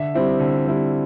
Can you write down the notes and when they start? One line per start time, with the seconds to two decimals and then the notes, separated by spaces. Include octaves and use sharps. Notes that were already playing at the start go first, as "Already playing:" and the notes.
Already playing: D3 E5
0.14 G3 C4 E4
0.40 D3
0.67 G3 C4 E4